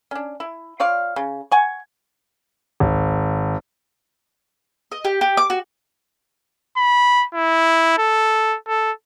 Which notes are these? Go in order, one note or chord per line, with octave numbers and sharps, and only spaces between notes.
C#4 D4
E4
F4 C#5 D5 F5
C#3
F#5 G#5 C#6
G#1
D#5
G4
G4
D6
F#4
B5
E4
A4
A4